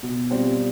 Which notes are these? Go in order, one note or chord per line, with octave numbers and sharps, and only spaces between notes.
B2
G3 C4 F4